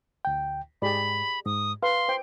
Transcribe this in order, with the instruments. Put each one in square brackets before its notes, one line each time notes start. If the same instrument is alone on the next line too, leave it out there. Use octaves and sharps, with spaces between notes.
[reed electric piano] D2 G5
[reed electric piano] G#2 [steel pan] G4 G#4 D5 [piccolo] B5
[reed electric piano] G#2 [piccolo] D#6
[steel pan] B4 [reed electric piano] F5 [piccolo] C6
[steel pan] C5 G5